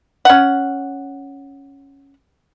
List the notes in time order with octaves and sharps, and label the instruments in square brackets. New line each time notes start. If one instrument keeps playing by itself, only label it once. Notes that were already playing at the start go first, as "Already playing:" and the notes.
[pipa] C#4 F#5